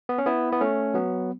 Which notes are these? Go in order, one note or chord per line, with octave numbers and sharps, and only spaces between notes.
B3
C#4
B3 E4
B3
A3 C#4
F#3 B3